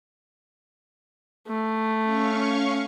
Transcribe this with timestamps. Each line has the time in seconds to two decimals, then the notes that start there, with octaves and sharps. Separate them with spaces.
1.48 A3
2.04 C#4 F5 C#6